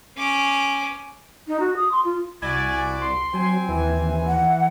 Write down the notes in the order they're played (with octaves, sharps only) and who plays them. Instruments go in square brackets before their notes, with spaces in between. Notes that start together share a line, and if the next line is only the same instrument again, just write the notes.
[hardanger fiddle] C#4 D6
[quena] D#4
F#4
D#6
C6
F4
[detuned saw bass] C2 [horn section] E4 F#4 D5 [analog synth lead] G#5
[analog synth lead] C6
[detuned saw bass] F#3 [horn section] C4 G#5
[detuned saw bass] D#2 [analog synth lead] E3
[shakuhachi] F#5